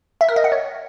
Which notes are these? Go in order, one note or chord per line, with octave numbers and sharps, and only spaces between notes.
E5
A#4
D#5
F#5
C#5